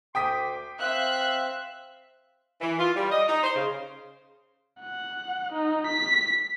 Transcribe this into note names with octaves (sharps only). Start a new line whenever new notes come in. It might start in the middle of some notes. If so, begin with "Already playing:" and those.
D2 G5 C6 D6 D#6 B6
C4 E5 F5 F#6
E3
F4
G3
D#5
D#4
C5
C#3
F#5
D#4
B6